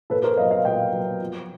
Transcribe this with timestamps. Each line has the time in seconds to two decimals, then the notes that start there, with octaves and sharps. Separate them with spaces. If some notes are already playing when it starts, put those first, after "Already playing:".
0.10 A#2 A4 B4
0.24 A#4 C5
0.37 F#3 B3 D#5 F5
0.51 D#5 F5
0.65 A#2 F5 G5
0.93 F#3 B3
1.20 F3